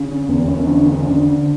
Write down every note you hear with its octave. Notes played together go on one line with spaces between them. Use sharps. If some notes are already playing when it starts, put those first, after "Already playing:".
Already playing: D3 C#4
E2 B3
C#4
D3 D4
C#4
D3 D4